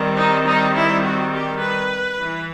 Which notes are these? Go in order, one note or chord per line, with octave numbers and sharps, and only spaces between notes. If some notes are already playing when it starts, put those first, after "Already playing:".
Already playing: D#3 G3 C4
D#4
D#4
E4
F#4
G4
B4
E3